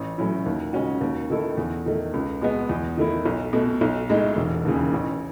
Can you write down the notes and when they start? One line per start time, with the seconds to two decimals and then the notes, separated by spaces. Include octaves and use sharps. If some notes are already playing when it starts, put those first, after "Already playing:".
Already playing: A1
0.18 A2 F#3 C#4 E4
0.46 D#2
0.73 C#3 G#3 C#4 F#4
1.01 D#2
1.30 D#3 A3 E4 A4
1.57 E2
1.86 D#3 A3
2.14 C#2
2.42 B2 G#3 B3
2.69 E2
2.97 D#3 A3 E4
3.25 B1
3.53 B2 A3
3.81 B1
4.10 A2 G#3 D#4
4.36 E1
4.65 D#2 C#3 E3
4.92 A1